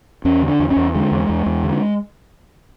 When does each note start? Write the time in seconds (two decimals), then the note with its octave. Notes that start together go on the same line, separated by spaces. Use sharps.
0.25 E2 C#4
0.42 D3
0.48 D4
0.60 E2
0.70 C#4
0.76 E2
0.94 D3 G#3
1.12 E2
1.29 E2
1.46 E2
1.64 D3